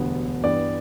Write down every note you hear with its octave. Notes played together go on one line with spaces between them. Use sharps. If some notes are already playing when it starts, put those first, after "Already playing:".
Already playing: E1 D2 D3 G3 B3
G2 E3 G3 B3 D5